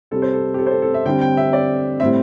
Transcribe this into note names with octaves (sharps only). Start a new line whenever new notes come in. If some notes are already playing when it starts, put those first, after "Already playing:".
C3 G3 C4 A4
C5
A4
G4
A4
C5
A4
A4
E5
D3 G3 C4 G5
G5
E5
D5
A2 G3 C4 E5